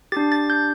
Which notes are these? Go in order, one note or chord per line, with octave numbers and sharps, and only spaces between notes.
D4 G4 A6
A6
G6